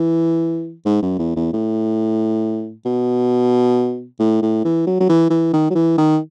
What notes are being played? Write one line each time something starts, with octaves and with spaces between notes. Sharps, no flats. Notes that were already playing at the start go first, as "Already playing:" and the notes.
Already playing: E3
G#2
F#2
E2
E2
A2
B2
A2
A2
E3
F#3
F#3
E3
E3
D#3
F#3
E3
D#3